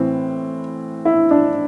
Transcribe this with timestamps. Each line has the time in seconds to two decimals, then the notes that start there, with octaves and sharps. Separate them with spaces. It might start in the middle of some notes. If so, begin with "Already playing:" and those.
Already playing: A2 E3 C4
1.05 E4
1.31 D4